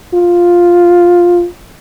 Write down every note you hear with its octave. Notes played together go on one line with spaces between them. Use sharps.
F4